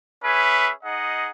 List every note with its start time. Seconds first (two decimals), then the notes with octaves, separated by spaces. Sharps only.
0.24 C#4 G#4 B4 E5
0.83 D#4 G#4 D#5 F#5